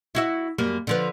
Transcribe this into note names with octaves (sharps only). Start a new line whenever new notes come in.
E4 F#4 E5
F#2 G3 A#3
D3 F3 B4